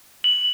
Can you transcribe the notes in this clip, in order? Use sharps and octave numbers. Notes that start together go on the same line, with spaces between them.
F#7